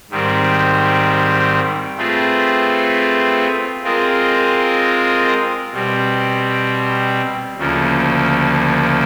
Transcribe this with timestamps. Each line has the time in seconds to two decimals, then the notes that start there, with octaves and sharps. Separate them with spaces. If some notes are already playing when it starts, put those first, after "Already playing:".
0.10 G#2 D#3 G3 C4
1.98 A3 C4 F4 G#4 B4
3.84 G#3 C4 F4 A#4 D#5
5.72 B2 G3 C4
7.58 D2 C#3 F3 A#3